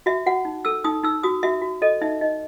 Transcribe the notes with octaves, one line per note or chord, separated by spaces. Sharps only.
F#4 E5
F#4 F#5
D#4
A4 E6
D#4 D#6
D#4 E6
F#4 D#6
F#4 E5
F#4
A4 D#5
D#4 E5
D#4 D#5